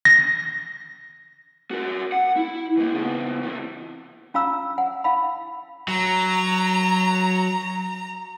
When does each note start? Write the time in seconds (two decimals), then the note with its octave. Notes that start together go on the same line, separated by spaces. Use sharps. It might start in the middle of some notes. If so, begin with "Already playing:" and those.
0.05 A#6
1.71 F#4 A#4
2.12 F#5
2.36 E4
2.77 E3 A#3
2.93 C#3 B3
3.43 C2 E3
4.34 C#4 F4 F5 A#5 E6
4.78 F#5
5.04 E4 F5 F#5 B5
5.88 F#3 A#5